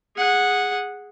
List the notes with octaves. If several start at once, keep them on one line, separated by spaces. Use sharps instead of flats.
G#4 F#5